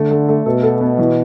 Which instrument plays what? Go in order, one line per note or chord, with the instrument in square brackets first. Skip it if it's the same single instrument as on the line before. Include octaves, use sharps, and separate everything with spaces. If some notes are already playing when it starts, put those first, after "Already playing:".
Already playing: [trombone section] D3 [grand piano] A3
[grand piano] A3
A3
[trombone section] B2 [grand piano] A4
[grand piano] A4
B3
E3